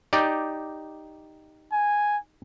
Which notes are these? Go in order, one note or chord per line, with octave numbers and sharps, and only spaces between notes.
D#4 G4 D5
G#5